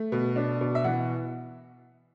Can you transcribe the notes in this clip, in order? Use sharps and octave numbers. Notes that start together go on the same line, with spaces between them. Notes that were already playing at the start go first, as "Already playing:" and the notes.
Already playing: A3
B2
D4
B2
E5
E3 F#5